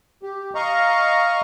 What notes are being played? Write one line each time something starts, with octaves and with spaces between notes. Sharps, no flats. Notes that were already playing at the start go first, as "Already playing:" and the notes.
G4
D#5 F5 A#5 C#6